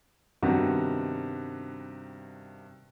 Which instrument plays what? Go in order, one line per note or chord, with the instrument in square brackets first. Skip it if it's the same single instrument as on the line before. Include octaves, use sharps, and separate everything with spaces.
[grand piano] G2 C3 D#3 G3 B3 F#4